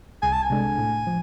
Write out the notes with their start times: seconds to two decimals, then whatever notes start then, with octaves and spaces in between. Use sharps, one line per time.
0.22 C2 G#5
0.33 A5
0.42 G#5
0.50 C3 G#3 D4 A4
0.78 A2
1.07 F3